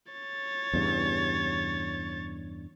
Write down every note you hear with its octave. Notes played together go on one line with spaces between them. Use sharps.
C#5 A6
E2 G2 C#3